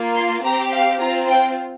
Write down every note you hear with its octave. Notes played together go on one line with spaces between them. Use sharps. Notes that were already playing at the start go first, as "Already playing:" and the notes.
Already playing: A#3 F4
C6
C4 G4 A#5
F5
C4 F4 A#5
G5